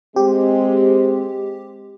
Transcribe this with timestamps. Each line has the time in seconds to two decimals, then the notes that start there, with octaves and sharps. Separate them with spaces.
0.16 G#3 C4 G4